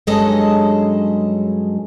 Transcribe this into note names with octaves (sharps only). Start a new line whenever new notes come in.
G2 F#3 G#3 C#4 A4 D#5